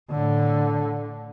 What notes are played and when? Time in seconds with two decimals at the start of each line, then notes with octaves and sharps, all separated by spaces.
0.10 A2 D3